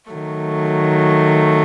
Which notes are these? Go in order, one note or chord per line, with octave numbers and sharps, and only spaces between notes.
D#3 F#3 A3